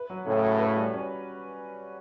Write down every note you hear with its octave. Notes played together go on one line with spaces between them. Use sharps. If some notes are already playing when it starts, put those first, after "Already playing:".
Already playing: B4
F#3
A2 C#3 C#4
F#4
B4
G3
C#4